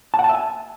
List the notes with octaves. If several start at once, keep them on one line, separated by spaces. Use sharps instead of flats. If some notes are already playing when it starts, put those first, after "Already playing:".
A5
F#5
A5
E5
G#5